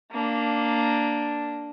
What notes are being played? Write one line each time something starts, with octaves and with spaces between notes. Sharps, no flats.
A#3 D4